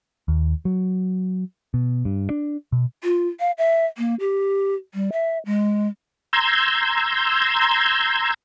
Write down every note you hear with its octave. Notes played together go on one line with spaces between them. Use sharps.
D#2
F#3
B2
G2
D4
B2
F4
F5
E5
A#3
G4
G3
E5
G#3
A#5 C6 E6 G6 G#6